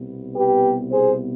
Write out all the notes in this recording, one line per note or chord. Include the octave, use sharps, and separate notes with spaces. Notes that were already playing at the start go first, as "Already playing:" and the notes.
Already playing: C2 B2 B3
G4 B4
G#4 C5